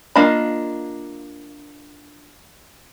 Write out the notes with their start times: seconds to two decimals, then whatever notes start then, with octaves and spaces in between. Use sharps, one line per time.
0.16 A#3 D4 F4 D#5 B5